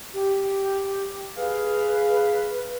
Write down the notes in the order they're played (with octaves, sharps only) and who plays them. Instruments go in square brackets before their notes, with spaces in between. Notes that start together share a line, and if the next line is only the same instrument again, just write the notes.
[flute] G4
[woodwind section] G#4 F5 [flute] B4